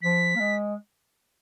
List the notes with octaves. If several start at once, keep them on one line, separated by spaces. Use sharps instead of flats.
F3 B6
A#3
G#3